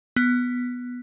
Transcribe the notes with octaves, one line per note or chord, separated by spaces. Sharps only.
B3